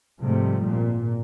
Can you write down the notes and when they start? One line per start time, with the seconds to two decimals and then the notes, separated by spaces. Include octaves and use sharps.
0.20 G#2 C3 F3 G3 A3
0.67 G#1 A#2